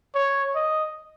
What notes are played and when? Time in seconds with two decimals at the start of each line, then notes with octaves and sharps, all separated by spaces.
0.15 C#5
0.55 D#5